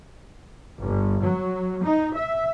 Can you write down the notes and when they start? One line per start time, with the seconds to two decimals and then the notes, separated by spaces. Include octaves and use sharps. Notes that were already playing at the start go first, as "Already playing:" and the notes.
0.82 G1
1.22 F#3
1.83 D#4
2.16 E5